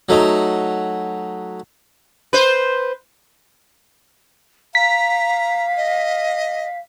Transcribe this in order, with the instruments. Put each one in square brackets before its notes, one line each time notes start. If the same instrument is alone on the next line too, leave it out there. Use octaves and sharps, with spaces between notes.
[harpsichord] F#3 A3 D#4
[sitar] B4 C5
[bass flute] F5 [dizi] A#5 [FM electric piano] B6
[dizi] D#5